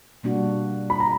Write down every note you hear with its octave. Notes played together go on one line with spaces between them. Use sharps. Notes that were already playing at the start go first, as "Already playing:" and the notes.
B2 G3 A#3 D4 F#4
B5
A#5